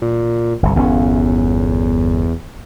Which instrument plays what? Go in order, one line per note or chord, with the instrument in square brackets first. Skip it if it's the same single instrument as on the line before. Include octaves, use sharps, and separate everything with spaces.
[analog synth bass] A#2
[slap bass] G1 C2
[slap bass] G1 C#4 [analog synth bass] E2